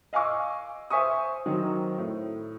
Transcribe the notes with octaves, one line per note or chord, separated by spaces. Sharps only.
D#5 F5 G#5 C#6 D6 E6
C5 E5 G#5 C#6 D#6
D#3 F#3 C4 D#4
A2